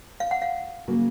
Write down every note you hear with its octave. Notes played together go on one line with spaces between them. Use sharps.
F5
F#5
F5
C#3 F#3 A#3